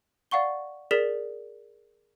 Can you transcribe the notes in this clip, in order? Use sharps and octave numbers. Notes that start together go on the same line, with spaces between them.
D5 F5 F#5 C#6 G7
G#4 A#4 D5 B6 E7